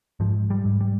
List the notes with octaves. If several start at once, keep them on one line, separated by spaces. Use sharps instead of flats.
G#2 F3
G3
G#2
G3